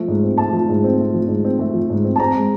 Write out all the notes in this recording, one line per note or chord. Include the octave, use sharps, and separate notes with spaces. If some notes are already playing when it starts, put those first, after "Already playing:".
Already playing: F3 A3
G#2
C4
A3 A5
F3
G#2
C4
A3
F3
G#2
C4
A3
F3
G#2
C4
A5
C4 A#5
G#3